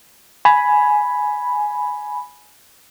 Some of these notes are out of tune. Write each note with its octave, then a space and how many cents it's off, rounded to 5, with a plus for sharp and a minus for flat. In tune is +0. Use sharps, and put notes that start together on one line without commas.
G#5 +10 B5 +0